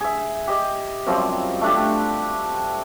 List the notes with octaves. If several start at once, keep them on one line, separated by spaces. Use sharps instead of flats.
G#4 E5
G4 D#5
F#2 F3 G3 C4
A3 D4 G4